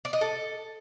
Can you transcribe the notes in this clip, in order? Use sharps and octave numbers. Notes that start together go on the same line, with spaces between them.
D5
D#5
A4